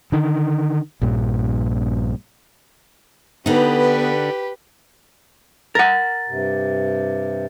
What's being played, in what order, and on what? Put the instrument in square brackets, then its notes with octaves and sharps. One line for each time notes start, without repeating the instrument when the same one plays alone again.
[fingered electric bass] D3 D#3
A#1 G2 A#2
[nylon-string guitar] D3 D#4 [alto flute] B3 [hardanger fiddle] G4 B4
[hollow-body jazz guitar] A#4 F#5 [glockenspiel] A6
[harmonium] G2 C3